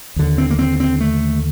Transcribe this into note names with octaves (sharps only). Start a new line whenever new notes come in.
D#2 D3
C4
A#3
C4
C4
A3